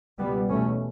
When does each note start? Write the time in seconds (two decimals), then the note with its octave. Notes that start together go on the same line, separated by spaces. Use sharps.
0.19 C#2 B2 G3 B3
0.49 E2 B2 A3 C#4